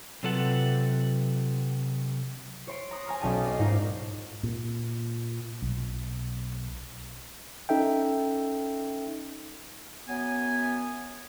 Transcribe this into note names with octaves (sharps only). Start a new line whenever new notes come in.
C3 F#3 F4 A4 B4 F#5
C#5 C6 D7
A#5 D#6 F#6
G#5 A#5 F6
B1 C#4 D5 G5 A5 D#7
D5 D#5 C7
G#2 D#4 F4 A#4
A#2
B1
C#4 D#4 A4 E5 G5
F#2 B3 G#5